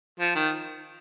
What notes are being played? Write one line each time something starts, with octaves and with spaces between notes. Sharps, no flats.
F3
D#3